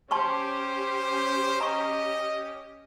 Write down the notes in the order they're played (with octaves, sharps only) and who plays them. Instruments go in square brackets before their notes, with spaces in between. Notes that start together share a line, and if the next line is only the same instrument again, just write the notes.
[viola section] C#4 G4 [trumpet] C5 [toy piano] A5 C6 C#6
[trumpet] D#5 [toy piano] A#5 C#6